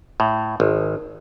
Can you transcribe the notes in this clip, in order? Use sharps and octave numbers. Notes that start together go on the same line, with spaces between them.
A2
G#1